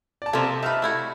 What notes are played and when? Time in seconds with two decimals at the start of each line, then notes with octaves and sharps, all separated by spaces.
0.22 D5 A5
0.33 C3 F3 A#3 A4
0.63 D#4 B4 E5 A5 F6
0.82 A3 E4 F#4